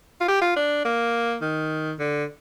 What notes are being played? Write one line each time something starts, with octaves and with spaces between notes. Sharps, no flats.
F4
G4
F4
D4
A#3
D#3
D3